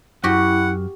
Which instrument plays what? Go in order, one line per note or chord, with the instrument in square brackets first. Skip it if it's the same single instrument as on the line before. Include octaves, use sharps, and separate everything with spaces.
[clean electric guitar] F#2 [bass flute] E4 [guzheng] F#4 G4 [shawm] F#5